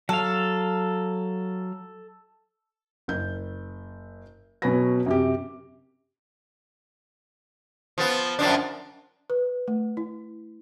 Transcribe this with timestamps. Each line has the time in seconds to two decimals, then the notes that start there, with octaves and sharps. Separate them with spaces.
0.09 F#3 A4 F5
3.08 F#1 G6
4.62 B2 F#3 C#4 B4 B5 A#6
5.06 F#2 C3 G4
7.98 F3 B3
8.39 F#2 F3 D4
9.30 B4
9.68 A3
9.97 E4